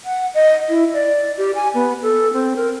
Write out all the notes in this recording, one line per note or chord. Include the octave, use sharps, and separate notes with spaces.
F#5
D#5
E4
D5
G4
G#5
B3
A4
C4
A#4